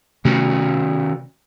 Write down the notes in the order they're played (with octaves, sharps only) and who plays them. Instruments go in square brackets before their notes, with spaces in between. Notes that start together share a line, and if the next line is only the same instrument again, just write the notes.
[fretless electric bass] C3 A3 [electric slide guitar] D#3 C#4 F#4